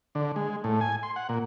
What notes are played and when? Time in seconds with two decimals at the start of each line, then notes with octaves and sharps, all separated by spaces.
0.15 D3
0.36 G#3
0.64 A2
0.81 G#5
1.03 C6
1.16 F#5
1.29 A#2